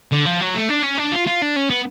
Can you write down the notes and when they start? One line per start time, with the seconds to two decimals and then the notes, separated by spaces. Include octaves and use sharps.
0.12 D3
0.26 F3
0.41 F#3
0.56 A3
0.70 D4
0.84 C#4
0.98 D4
1.12 F4
1.27 F4
1.42 D4
1.56 C#4
1.70 B3